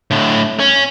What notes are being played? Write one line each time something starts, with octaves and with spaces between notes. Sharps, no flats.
A2 D3
C#4